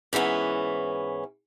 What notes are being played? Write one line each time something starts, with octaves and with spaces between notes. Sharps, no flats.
G#2 E3 B3 C#4